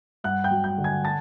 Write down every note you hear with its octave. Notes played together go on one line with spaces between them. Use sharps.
G2 F#5 F#6
G5 G6
F#3
G5 G6
D3
G#5 G#6
A5 A6